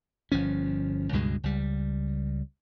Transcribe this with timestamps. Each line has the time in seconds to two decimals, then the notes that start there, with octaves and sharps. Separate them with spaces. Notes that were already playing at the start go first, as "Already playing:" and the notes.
0.32 G1 F3 C#4
1.13 C#2 G2 B2 G#3
1.44 C#2 G3